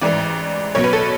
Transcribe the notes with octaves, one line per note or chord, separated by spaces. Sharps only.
A1 G#2 E3 D5
B1 B2 C#5
B4
A4